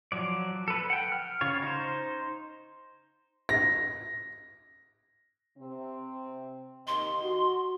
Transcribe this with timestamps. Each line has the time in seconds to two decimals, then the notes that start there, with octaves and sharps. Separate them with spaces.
0.12 F3 F#3 D5
0.68 A4 B4
0.90 F#5 G5
1.12 F6
1.41 C#3 F4 C#5
1.62 D#4 C5
3.49 A#6
5.58 C3 C4
6.87 D#2 D#5 C6
7.22 F#4